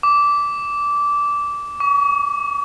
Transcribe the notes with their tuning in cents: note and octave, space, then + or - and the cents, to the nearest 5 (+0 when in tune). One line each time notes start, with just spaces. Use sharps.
D6 -15
C#6 +40